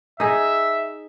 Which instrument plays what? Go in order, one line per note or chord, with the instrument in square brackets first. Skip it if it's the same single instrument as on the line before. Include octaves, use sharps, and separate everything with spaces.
[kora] D#4 G#4 [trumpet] E5